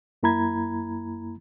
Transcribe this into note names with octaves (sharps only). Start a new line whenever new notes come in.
F#2 A#3 E4 A#5 B5 G#6